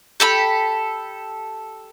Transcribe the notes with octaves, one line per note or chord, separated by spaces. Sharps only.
G4 A4 B5